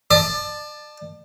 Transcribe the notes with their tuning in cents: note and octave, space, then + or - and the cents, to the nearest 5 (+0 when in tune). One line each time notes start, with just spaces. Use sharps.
D5 +35 A5 +0